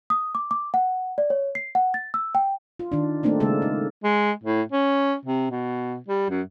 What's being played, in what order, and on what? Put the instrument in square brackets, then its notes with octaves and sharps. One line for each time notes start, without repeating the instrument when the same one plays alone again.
[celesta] D#6
D6
D6
F#5
D5
C#5
C7
F#5
A6
E6
G5
[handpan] F4
D#3 D4
A3 A#3 C4 D4 D#4
C#3 G#3 A#3 A4
D#4
[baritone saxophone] G#3
A2
C#4
C3
B2
G3
F#2